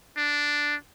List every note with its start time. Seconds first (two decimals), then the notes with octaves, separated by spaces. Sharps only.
0.17 D4